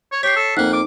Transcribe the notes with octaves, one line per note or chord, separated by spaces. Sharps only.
C#5
G4 C#5 B6 C7
A4
F2 A#3 D#4 F#5
D6